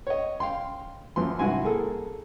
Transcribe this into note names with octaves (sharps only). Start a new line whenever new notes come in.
C#5 D#5
F5 G5 C6
F#2 E3 F3 C6
C2 G#2 E4 F#4 G#5 C6
A#3 G#4 A4